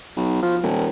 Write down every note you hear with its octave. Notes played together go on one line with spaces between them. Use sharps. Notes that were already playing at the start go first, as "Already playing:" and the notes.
B1
F3
D#1